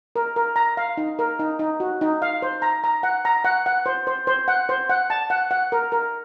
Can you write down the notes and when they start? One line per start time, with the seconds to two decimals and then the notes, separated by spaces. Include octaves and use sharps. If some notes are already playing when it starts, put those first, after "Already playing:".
0.16 A#4
0.36 A#4
0.56 A#5
0.77 F5
0.97 D#4
1.19 A#4
1.39 D#4
1.59 D#4
1.80 F#4
2.01 D#4
2.22 F5
2.42 C5
2.62 A#5
2.84 A#5
3.03 F#5
3.25 A#5
3.44 F#5
3.66 F#5
3.86 C5
4.07 C5
4.27 C5
4.48 F#5
4.69 C5
4.89 F#5
5.10 A5
5.30 F#5
5.51 F#5
5.72 A#4
5.92 A#4